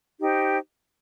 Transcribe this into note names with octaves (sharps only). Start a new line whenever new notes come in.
D#4 G4 C5